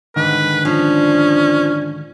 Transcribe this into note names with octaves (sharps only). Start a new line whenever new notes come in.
G#2 D3 D#3 B4
F3 C#4 D4